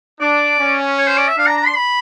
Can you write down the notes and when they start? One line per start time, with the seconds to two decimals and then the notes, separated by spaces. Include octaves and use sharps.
0.20 D4 D5
0.60 C#4
0.98 C#5
1.08 C5
1.18 D5
1.28 E5
1.38 D4 F5
1.47 A#5
1.57 A#5
1.67 C6
1.76 B5